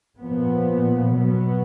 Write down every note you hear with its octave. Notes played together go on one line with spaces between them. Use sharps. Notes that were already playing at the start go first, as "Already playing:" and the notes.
A#2 F3 B3
B2 F#3 B3